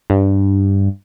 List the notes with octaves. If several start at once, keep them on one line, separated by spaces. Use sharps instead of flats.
G2